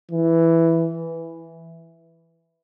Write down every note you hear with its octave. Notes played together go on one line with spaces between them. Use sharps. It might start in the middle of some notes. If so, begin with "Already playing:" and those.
E3